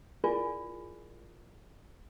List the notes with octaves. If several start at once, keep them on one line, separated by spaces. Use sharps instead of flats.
E4 F4 G#4 A#4 D5 G#5